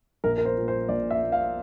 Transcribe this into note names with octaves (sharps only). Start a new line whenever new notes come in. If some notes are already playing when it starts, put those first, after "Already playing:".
A#1 A#4
A#4
C5
A#2
C5
A#1 D5
E5
A#2
F5